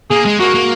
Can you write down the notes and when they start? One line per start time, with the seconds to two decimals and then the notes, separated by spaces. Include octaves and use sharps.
0.10 A#3 G#4
0.25 G#3
0.40 A#3 F#4
0.55 A#3